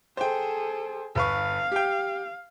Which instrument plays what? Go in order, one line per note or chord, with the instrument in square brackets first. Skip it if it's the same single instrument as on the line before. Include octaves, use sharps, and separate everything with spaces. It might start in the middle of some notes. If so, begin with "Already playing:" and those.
[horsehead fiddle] G#4 A4 [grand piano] C5 G5
[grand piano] G1 B4 C#6 [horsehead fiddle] F5
[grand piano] G4 G5